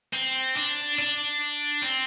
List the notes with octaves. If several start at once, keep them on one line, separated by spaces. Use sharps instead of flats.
C4
D4
D4
C4